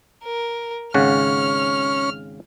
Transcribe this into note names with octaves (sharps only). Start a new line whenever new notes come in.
A#4
G#1 C#3 C#4 F#5 F6